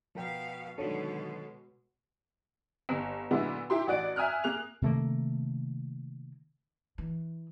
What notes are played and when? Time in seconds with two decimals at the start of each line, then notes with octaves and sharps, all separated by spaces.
0.15 B2 F3 A#4 F5 G5
0.78 B2 D3 D#3 F#3 G#3 A4 C#5
2.89 G1
3.31 A#2 D3 F#3 G#3 B3 E4
3.70 E4 G4 C6
3.87 A1 F#4 D5 F#6 D7
4.16 E5 G#5 D#6 F6 F#6
4.44 A#3 G#4 F#6 F7
4.82 C3 D#3 A3 A#3
6.98 E3